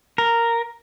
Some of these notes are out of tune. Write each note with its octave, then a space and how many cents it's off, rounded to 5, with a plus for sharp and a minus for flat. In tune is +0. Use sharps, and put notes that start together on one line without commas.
A#4 -5